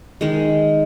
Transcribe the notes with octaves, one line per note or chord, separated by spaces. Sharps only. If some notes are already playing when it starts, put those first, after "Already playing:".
D#3 G#3